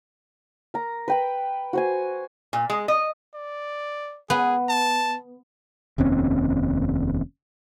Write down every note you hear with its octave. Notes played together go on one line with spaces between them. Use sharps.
A#4 A#5
B4 G5 B5
F#4 C5 G#5
A#2
G#3
D#5
D5
B3 G#4
A5
F1 D#2 C4 C#4